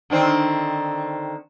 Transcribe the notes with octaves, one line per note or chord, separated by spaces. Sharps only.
D3 D#3 C4